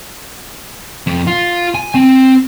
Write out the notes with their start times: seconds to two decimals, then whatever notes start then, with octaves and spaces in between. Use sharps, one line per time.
1.07 F2
1.27 F4
1.75 G#5
1.94 C4